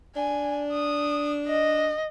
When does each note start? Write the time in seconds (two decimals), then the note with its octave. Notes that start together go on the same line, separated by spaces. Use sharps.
0.16 D4 G#5
0.72 D#6
1.48 D#5